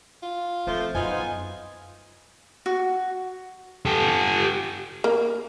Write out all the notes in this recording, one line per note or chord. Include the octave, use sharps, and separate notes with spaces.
F4
F3 A3 C4 C5
F#2 B3 D#4 F4 G#5
F#4
G4 A4
A#3